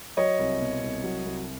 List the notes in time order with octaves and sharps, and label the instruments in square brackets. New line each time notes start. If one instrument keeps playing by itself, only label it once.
[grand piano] F#3 C#5 D#5
C2
B2
C2
F#3
C2